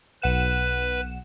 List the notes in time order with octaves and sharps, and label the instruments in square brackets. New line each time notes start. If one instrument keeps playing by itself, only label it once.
[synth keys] B1 F#5 E7 [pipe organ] B4